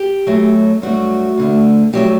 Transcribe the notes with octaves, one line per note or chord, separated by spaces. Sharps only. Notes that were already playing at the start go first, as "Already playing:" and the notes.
Already playing: G4
F#2 F#3 A3
G2 F#3 A3 F#4
D2 D3 A3
G2 F#3 A3 G4